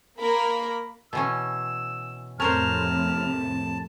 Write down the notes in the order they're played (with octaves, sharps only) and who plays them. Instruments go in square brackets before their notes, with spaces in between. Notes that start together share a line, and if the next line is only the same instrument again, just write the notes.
[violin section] A#3 A#4 [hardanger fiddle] B5
[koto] B2 E3 C#4 [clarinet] E6
[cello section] F2 A2 C3 [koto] C#4 A#4 C5 [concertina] A5 [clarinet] F6